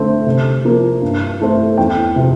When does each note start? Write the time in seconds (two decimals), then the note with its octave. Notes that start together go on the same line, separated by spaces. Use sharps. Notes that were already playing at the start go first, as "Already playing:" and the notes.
Already playing: D3 A3 C4
0.27 C3
0.65 F3 A#3
1.02 G2
1.40 E3 A3 C4
1.77 E2 G5
2.16 C3 F3 C4